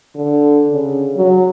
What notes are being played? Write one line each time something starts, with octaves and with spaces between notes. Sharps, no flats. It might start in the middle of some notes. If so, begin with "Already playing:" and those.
D3
C#3
F#3